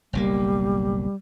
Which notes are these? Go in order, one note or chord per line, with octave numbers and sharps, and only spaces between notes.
F#1 B1 G3 A#3